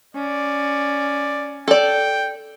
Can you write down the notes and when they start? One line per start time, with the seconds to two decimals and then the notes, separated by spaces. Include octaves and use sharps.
0.15 C#4 D5
1.68 A4 D5 G5